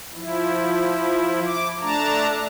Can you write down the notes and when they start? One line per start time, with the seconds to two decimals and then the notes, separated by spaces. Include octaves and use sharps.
0.15 F3 E4
1.46 D6
1.81 A3 D4 A5 A#5